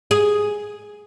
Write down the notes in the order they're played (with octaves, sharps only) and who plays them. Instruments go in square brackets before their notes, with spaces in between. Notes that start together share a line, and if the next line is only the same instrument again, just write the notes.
[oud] G#4